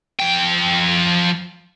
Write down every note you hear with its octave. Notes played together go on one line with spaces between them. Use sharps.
F3 G5